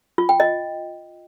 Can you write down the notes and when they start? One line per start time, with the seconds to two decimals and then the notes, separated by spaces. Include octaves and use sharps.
0.18 F4
0.29 G5
0.40 D#5